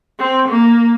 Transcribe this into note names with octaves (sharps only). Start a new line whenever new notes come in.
C4
A#3